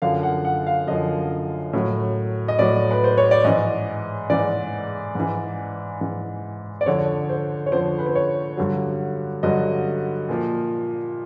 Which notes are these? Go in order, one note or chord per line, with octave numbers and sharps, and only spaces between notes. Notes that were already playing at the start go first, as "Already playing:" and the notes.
F#2 D3 F3 F5
F#5
F#5
F5
F#2 D3 F3 D#5
A2 F#3
D#5
A2 F#3 D5
B4
C5
C#5
D5
G#2 E3 D#5
G#2 E3 D5
G#2 E3
G#2 E3
D5
F2 D3 F3 C#5
C5
C#5
F2 D3 F3 C5
B4
C5
C#5
G2 D3 F#3
G2 D3 F#3 D#5
A#2 F3